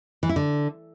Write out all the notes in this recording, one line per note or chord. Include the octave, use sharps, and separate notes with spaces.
E3
E4
D3